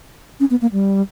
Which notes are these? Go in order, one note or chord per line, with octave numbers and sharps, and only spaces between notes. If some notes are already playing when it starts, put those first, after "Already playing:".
C#4
B3
A#3
G3